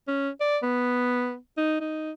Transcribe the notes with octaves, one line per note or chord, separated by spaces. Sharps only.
C#4
D5
B3
D#4
D#4